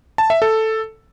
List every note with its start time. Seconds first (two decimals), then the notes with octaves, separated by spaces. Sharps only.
0.18 A5
0.30 E5
0.42 A4